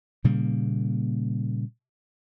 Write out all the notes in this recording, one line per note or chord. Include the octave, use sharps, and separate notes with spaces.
A#2 C#3 G3 A#3